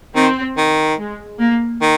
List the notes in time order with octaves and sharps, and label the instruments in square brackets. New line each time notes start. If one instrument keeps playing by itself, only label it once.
[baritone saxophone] D#3 [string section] C4
[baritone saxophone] D#3
[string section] G#3
A#3
[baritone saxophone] D#3